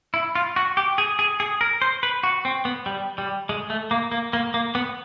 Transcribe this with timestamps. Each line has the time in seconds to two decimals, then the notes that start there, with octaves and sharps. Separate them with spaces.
0.14 E4
0.35 F4
0.56 F#4
0.77 G4
0.98 G#4
1.19 G#4
1.40 G#4
1.61 A#4
1.82 C5
2.03 B4
2.23 F#4
2.45 C4
2.65 B3
2.86 G3
3.18 G3
3.49 G#3
3.70 A3
3.91 A#3
4.12 A#3
4.33 A#3
4.54 A#3
4.75 B3